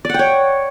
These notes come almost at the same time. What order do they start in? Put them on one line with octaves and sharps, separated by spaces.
D5 F#5 G5 C#5